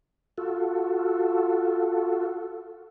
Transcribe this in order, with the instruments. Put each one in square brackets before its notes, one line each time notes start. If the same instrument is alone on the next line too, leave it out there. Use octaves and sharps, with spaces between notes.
[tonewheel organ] F4 F#4 A4